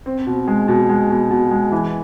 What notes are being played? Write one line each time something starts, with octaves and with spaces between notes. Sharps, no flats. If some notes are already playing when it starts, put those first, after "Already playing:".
C4
B2
G#3
B2
G#3
B2
B2
G#3
E3